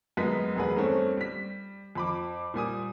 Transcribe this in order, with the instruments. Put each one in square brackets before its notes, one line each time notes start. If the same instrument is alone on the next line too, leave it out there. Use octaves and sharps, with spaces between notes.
[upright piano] F#2 G#3 B3 B6
E1 G#4 B4
G2 A3 C4 C#4
G3 B6
F2 B5 D6
A#2 G3 G#5 D#6